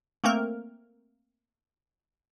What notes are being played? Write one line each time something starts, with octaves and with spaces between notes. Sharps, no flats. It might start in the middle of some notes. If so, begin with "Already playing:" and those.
A3 A#3 C4 A#4